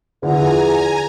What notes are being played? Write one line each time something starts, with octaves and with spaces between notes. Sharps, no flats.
E2 D3 F3 G#5 A#5